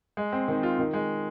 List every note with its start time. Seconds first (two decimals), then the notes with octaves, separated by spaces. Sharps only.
0.17 G#3
0.32 C4
0.48 D#3
0.63 F4
0.79 D#3
0.94 G#3